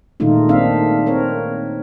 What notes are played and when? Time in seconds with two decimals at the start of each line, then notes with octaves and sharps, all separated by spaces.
0.20 A#2 D#3 G#3 A3 D#4 F4
0.49 A#3 C4 D4 E5 F5
1.06 C4 A#4 C#5